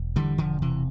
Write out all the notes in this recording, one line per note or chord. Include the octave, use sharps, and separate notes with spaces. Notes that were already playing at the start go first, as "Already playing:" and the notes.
Already playing: E1
D3 E3 G3
E1 D3 F3
C3 E3